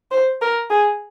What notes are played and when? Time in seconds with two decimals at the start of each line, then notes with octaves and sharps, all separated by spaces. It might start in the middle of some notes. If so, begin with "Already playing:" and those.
0.11 C5
0.41 A#4
0.70 G#4